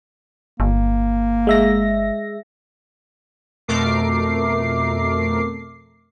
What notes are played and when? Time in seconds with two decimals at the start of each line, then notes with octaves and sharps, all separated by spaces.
0.60 G1 A#3
1.47 G#3 E5 A#6
3.68 F2 B2 A3 A#4 D6 C7